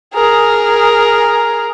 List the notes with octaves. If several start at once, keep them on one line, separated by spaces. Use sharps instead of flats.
G#4 A#4